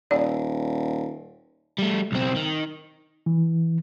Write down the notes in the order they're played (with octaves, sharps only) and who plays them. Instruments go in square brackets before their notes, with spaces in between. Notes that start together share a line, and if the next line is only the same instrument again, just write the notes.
[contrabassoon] D#1 [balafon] D5
[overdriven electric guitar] G3 A3
B1 C4
D#3
[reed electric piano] E3